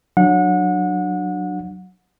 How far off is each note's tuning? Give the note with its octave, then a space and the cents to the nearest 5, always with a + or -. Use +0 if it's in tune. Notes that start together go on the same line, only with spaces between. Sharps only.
F#3 +0 D4 +20 F#5 -30